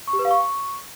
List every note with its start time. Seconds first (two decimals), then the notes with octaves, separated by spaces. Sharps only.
0.07 C#6
0.13 G4
0.19 B4
0.25 F5
0.31 C#6